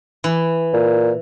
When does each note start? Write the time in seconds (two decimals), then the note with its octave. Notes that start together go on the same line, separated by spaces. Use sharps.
0.24 E3
0.74 A#2